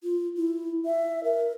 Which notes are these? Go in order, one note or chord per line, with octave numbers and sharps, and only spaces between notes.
F4
E4
E5
A#4